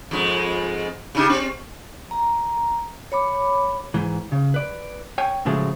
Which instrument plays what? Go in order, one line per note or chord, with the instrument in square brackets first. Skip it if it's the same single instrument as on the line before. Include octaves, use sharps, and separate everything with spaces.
[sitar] F2 G#2 G#3
C#3 D#4 G4
C4
[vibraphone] A#5
C#5 B5 D6
[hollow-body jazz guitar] G#2 E3
C#3
B4 D5
C#5 G5 G#5
A2 C#3 F3 F#3 G#3 A3